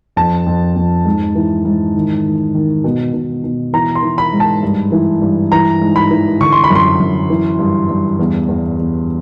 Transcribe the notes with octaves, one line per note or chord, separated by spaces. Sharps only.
F2 A5
F2
F2
G#2
E3
G#2
D#3
D#3
D#3
B2
B2
B2
E3 A#5
C6
E3
B5
G#2
A5
G2
E3
G2
E3 A#5
G#2
B5
E3
D3 C#6
C6
B5
F#2
C6
F#2
E3
G2
G2
E2
E2
E2